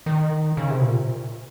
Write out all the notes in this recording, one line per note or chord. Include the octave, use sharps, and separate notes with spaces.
D#3
C#3
C3
A#2